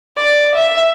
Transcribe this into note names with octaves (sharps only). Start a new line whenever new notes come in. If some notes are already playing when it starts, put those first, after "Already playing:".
D5
E5